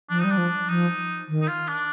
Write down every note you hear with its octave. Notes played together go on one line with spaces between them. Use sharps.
F3 D4
G3 D#4
D4
F3
F3 D#4
D#3
D#4
F4
D4